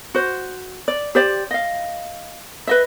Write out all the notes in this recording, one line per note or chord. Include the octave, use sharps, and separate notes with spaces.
F#4 C5
D5
G4 C5 D5
D#5 F5
B4 D#5 E5